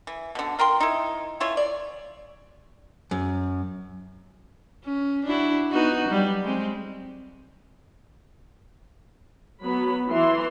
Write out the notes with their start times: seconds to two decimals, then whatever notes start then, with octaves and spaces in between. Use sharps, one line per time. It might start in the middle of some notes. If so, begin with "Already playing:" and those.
0.07 E3
0.35 B2 D3
0.59 F4 A#4 G5 C6
0.80 D#4 E4
1.40 E3 E4 F4 C#5
1.57 D5
3.11 F#2
4.85 C#4
5.26 D4 E4 F#4
5.71 B3 D#4 F#4
6.08 F#3 G3
6.43 G#3 C4
9.64 F#3 B3 B5
10.10 E3 C6